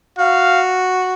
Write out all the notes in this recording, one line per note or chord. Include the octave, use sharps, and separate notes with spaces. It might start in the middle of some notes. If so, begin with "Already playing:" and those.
F#4 F5